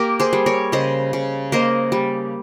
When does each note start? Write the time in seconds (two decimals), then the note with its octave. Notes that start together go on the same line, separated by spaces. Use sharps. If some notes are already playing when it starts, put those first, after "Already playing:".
Already playing: A#3 G4 A#4
0.20 G#4 C5
0.33 G3
0.46 A#4 C#5
0.72 C#3 C5 D#5
1.13 C#3
1.52 A#3 C5 D#5
1.92 G3